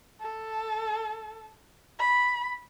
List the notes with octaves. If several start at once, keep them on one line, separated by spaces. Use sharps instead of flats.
A4
B5